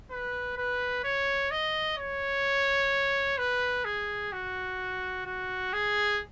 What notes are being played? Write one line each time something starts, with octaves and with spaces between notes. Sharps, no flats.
B4
B4
C#5
D#5
C#5
B4
G#4
F#4
F#4
G#4